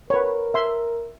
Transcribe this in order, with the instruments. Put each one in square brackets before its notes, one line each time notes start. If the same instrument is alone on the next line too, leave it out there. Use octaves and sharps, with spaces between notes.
[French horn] A#4 [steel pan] B4 C#5
[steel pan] E5 C6